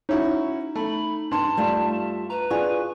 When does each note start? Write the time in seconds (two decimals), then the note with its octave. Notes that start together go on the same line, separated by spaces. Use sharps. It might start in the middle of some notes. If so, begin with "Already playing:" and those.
0.09 C#4 D#4 E4 F#4
0.76 A3 B5
1.31 G2 A5 C6
1.57 G3 A3 F4
2.30 B4 A#5
2.50 D4 F4 G#4 C#6